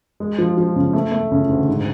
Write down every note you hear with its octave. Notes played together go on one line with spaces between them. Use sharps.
G#3
F3
F3
C#3
A3
A3
C#3
D2
G#2